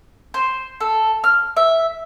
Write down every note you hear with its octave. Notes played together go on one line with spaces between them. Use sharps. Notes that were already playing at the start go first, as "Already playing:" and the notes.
C5
A4
F6
E5